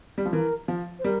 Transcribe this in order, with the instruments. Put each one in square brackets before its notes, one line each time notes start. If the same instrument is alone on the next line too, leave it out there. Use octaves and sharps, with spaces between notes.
[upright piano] G3
F3
[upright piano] E3 [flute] A#4
[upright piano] F3
[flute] C5
[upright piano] G3 [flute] A#4